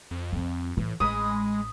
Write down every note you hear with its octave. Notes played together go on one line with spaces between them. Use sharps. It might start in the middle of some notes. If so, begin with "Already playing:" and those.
F2
F3 C4
A2 E3
A1 G#3 B5 D#6